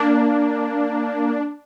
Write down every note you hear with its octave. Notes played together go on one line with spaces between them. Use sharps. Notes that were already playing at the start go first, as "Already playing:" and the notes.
Already playing: A#3 D4